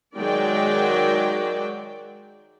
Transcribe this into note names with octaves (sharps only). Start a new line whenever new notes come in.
D#3 F#3 G#3 F#4 D5 G5